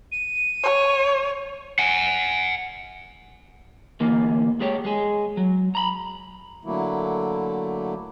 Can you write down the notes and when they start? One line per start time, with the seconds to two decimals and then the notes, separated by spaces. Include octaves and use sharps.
0.12 D#7
0.63 C#5
1.79 F#5 G#5
4.00 D2 E3 A#3
4.60 G#3 G4 C#5
4.85 G#3 G#4
5.37 F#3
5.75 A#5 B5
6.65 D3 F#3 A3 A#3 E4